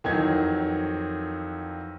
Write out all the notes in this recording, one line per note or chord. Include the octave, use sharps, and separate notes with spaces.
F2 D#3 E3 F#3 G#6